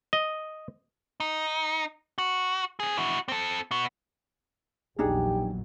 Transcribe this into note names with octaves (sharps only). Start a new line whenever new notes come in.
D#5
D#4
F#4
C4 G#4
E4 F#4
C4 A4
B3 F#4
A#1 E2 F#3 D4 D#4 G4 G#4